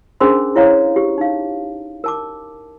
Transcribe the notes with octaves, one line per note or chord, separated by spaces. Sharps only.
C#4 D4 G#4 A#4 C5 C6
E4 C#5 F5 A#5
G4
D#4 F5
A#4 A5 D6